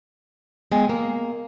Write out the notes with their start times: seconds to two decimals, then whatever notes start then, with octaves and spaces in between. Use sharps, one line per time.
0.72 G#3 B3 G#5
0.89 A#3